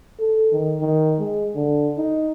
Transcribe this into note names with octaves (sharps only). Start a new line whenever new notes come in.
A4
D#3
D#3
G#3
D3
D#4